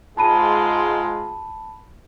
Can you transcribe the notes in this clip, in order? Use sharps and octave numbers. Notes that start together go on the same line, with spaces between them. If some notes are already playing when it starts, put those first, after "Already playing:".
G#2 G#3 F4 A5 B5 D#7